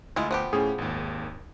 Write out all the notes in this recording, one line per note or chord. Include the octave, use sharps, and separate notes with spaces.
D2 G#3 E4 F4
F3 B3 G4
A2 C#4 G#4
G#1 D#2